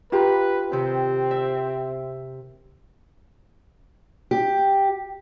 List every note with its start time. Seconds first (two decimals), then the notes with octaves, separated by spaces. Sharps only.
0.12 F4 G4 B4 A#5
0.72 C3 D#3 C4
1.31 E5
4.31 G4